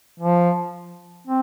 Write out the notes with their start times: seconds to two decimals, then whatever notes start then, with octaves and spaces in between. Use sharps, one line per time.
0.20 F3
1.27 C4